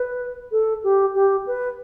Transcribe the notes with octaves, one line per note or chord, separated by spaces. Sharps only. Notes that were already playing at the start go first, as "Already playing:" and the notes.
Already playing: B4
A4
G4
G4
B4